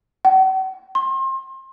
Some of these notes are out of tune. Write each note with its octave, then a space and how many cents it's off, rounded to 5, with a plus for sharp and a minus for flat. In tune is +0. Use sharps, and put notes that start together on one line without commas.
F#5 +45
C6 +30